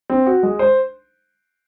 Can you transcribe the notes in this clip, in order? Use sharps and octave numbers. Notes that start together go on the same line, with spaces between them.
C4
F#4
G#3
C5